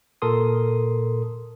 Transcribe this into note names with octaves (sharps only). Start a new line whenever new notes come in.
A#2 A4 A#4 C6 D#6